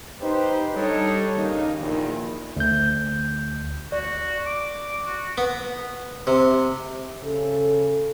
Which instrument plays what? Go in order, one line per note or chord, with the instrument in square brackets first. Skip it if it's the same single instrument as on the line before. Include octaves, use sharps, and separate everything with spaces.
[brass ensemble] D#4 G4 B4 C5
G3 D4 D#4 A4 C#5
D#2 C#3 A#3 D#4
A#1 E2 A#2 D#3
[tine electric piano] D2 G6
[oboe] F#4 [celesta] D5
[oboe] D6
F#4
[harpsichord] B3
C3
[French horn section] C#3 A4